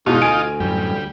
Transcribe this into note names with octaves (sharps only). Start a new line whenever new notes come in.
E2 G#2 B2 D#4 F4
D2 G#5 D7
F#2 A2 G3